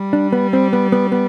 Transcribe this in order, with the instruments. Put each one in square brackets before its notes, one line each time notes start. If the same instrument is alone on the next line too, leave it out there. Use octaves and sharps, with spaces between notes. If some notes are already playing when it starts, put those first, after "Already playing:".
Already playing: [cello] G3
[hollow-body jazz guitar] D4
B3
C4
B3
B3
B3